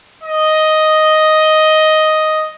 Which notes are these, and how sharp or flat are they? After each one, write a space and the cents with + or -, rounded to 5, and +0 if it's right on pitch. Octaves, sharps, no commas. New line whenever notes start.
D#5 +5